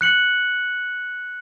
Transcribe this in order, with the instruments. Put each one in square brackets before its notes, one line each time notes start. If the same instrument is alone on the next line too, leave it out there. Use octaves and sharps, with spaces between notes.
[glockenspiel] F#6 C#7 F#7